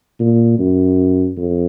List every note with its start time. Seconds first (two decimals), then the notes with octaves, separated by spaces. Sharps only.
0.20 A#2
0.59 F#2
1.37 F2